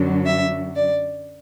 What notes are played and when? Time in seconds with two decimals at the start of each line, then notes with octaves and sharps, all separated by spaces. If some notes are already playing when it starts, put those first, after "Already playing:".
Already playing: F#2 D3 F#3
0.26 E5
0.75 D5